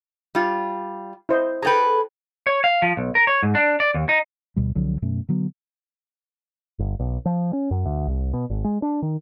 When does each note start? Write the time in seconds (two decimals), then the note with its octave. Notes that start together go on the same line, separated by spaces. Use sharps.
0.35 G3 F4
1.29 E4 C5 D#5
1.62 G#4 A4 B4 G5 A#5
2.47 C#5
2.64 F5
2.82 F3
2.97 B1
3.15 A#4
3.27 C#5
3.43 G#2
3.55 D4
3.80 D5
3.94 D#2
4.09 D#4
4.56 D2 B2 G3
4.75 C2 D3 F3 F#3
5.02 F#2 B2 A3 C#4
5.29 D3 F#3 B3
6.79 G1
6.99 B1
7.26 F3
7.53 C#4
7.71 F#2
7.86 D2
8.08 C2
8.34 B2
8.50 G#1
8.64 G#3
8.82 D4
9.02 D#3